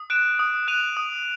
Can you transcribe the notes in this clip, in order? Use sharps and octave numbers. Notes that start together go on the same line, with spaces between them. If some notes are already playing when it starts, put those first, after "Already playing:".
Already playing: D#6
F#6 D7 E7
D#6
F#6 D#7 F7
D#6